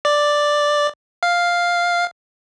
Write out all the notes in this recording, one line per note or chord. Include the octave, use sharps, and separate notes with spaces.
D5
F5